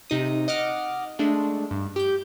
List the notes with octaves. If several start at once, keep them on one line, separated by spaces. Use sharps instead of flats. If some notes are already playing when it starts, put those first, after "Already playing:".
C3 D#4 D#6
D#5 F#5 D6 F6
G#3 A3 D4
G2
G4 G6